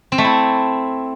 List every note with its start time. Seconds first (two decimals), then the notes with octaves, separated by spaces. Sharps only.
0.12 C4
0.18 A3
0.24 E4